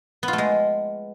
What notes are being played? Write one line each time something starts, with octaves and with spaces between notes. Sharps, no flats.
B3
F4
A3
G#3